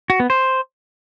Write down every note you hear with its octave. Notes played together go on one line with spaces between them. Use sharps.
F#4
B3
C5